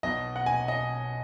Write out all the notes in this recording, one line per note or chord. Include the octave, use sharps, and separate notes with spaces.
B1 B2 D#5
F#5
G#5
D#5